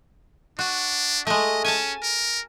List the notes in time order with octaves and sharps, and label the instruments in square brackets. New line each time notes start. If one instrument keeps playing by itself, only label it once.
[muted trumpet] D4 [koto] F#4
[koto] G#3 A3 [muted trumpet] D#5
[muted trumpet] C#4 [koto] G#5 A5
[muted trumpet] A#4